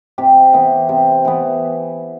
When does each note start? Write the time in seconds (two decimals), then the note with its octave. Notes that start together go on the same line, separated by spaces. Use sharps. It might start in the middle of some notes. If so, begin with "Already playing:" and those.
0.18 C3 G4
0.53 E3 B3
0.89 C3
1.25 E3 B3